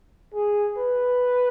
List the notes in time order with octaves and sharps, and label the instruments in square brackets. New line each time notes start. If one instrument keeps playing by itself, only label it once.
[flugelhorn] G#4
B4